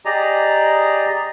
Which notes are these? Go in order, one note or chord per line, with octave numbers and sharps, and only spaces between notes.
G4 G#4 D5 D#5 A#5